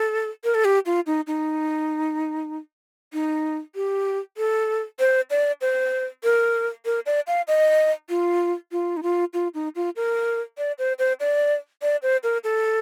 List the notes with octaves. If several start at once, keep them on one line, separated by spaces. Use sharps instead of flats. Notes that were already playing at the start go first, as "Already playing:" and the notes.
Already playing: A4
A#4
A4
G4
F4
D#4
D#4
D#4
G4
A4
C5
D5
C5
A#4
A#4
D5
F5
D#5
F4
F4
D#4
F4
F4
D#4
F4
A#4
D5
C5
C5
D5
D5
C5
A#4
A4